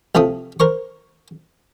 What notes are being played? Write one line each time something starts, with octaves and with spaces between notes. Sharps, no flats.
C2 F3 A3 C4 D#6
A#4 C5 C#6